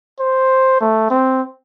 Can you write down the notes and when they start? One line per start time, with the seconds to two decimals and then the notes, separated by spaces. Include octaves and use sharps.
0.20 C5
0.81 A3
1.10 C4